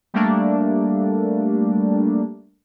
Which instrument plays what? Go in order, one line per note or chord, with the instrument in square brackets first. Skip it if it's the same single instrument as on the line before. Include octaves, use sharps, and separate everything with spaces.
[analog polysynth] G3 A3 A#3 D4